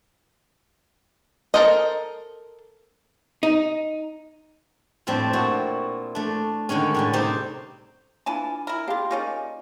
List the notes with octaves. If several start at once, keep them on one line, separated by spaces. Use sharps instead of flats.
A4 A#4 C5 D#5
D#4
F2 A2 G3 C4 D4 E5
A#2 E4 F#4 C#5 E5
A3 D4
D3 D#3 G#3 C#4
A2 D3 G3
C3 C4 D#4 G4
E3 D4 F4 G#5 A5
E4 A#4
D4 F4 G4 G#4 F5
A#3 C#4 D#4 F4 D5